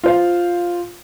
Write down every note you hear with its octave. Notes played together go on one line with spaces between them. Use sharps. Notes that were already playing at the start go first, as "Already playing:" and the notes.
F4 C5 F5